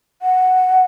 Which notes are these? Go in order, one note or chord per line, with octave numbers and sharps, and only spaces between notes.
F#5